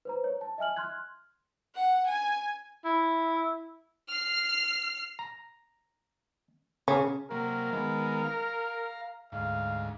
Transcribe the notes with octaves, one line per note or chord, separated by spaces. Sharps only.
B4 C5 A#5
C#5
A5
D#5 E5 G#5 F6 F#7
C6 F6 F#6 G#6
F#5
G#5
E4
F6 C7
A#5
C#3 C#4
C3 F#3 A#3 A#4
D#3 G#3 B3
F5 A#5
D2 G#2 F5